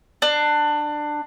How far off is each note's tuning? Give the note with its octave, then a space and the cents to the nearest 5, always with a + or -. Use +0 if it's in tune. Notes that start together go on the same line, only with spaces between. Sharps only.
D4 +20